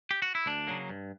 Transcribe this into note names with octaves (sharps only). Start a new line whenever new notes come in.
G4
F#4
E4
D2 D4
C#3 F#3 A#3
G2